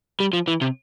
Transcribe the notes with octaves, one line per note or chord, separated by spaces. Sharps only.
G3
F3
E3
C3